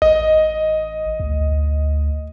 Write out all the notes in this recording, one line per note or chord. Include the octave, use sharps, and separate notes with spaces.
A1 D#5
D2